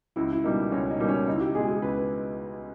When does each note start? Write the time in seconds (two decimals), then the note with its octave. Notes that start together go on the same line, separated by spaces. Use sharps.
0.16 C#2 E4
0.32 E4
0.44 B2 G3 A#3 D#4
0.72 C#2 C#4
0.90 D#4
0.99 B2 G3 A#3
1.09 C#4
1.27 C#2 D#4
1.34 E4
1.41 G4
1.55 B2 G#3 G#4
1.68 G#4
1.82 C#2 B4
1.96 B4